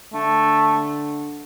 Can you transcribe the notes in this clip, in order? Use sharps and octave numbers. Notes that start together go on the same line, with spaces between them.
D3 A3